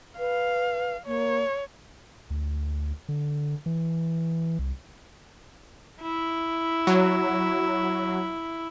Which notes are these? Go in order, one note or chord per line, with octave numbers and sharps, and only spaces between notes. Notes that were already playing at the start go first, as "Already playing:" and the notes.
B4 F5
A#3 C#5
D2
D3
E3
C2
E4
F#3